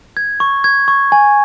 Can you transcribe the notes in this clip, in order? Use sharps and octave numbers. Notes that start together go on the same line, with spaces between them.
G#6
C#6
G#6
C#6
G#5